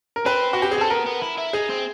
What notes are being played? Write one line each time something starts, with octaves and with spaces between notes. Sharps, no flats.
A#4
C4 B4
F#4
G4
G#4
C4 A4
B3 A#4
B3
E4
E4
D#4 G#4
C4